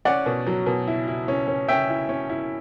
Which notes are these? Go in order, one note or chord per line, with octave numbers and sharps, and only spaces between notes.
C#4 D5 F#5
B2
F#3
B2
E4
E4
C#4
C#4
C#4 E5 G5
E4
C#4
E4